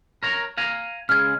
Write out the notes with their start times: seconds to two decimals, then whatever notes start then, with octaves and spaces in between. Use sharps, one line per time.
0.23 A#4 C#5 A#5
0.58 F5 G#5 A#5
1.09 C#3 G#3 F6 G#6